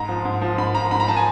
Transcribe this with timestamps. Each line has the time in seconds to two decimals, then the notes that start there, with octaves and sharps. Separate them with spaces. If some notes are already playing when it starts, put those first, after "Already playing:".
Already playing: G#2 A#5
0.09 F3
0.25 G#2
0.42 F3
0.58 G#2 B5
0.75 F3 A#5
0.91 G#2 B5
1.00 A#5
1.08 F3 A5
1.16 G#5